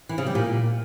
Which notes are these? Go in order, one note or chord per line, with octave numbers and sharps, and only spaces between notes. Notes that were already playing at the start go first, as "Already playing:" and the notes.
E3
C#3
G3
A#2